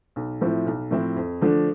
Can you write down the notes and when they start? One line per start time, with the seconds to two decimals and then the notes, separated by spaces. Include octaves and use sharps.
0.16 B1
0.41 A2 F3 C4 E4
0.66 B1
0.91 A2 F3 C4 E4
1.16 F2
1.41 D3 F3 A3 D4